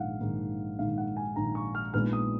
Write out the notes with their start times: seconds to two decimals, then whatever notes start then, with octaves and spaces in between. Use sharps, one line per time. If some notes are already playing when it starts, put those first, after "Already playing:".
Already playing: A#1 G#2 D#3 F5 F#5
0.21 A#1 G#2 D#3
0.78 A#1 G#2 D#3 F5
0.98 F#5
1.17 G#5
1.36 A#1 G#2 D#3 A#5
1.55 C#6
1.75 F6
1.94 A#1 A#2 G#3 B3 D#4 F6
2.13 D#6